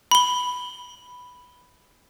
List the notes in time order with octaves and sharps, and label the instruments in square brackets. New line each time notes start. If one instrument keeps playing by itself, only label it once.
[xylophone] B5 G7